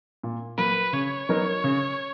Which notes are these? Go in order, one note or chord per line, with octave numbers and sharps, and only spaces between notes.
A#2
F#3 A#3 B4
C#3 C#5
F#3 B3 D#4 A#4
C#3